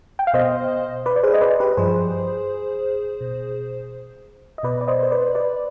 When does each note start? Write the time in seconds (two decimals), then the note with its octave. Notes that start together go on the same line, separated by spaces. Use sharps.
0.19 G5
0.27 F5
0.34 B2 C5 D#5
1.06 B4 D5
1.16 D5
1.23 G#4 C5
1.34 D#5
1.41 B4 D5
1.60 G4 B4
1.73 B4
1.77 G2 F3 G#4 C5
3.21 B2
4.58 D#5
4.63 B2 B4 D5
4.81 D5
4.88 C5 D#5
5.03 C5
5.11 B4 D5
5.35 B4 D5